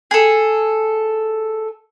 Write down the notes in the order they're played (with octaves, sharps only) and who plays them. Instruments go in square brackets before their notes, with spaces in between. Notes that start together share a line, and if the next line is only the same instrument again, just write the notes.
[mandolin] G#4 A4